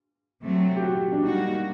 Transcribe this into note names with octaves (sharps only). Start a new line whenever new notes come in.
C3 F#3 A3 C4
G4
F#4
D4
G3 A#3 D#4 F#4